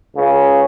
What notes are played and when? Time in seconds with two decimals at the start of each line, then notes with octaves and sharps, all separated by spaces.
0.16 C#2 C#3